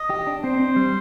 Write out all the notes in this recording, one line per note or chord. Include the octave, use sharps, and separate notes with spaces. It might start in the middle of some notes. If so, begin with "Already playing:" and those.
Already playing: D#5
G4
D4
C4 C5
C4
G3